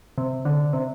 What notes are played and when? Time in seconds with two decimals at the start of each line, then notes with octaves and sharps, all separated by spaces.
0.18 C3
0.45 D3
0.73 C3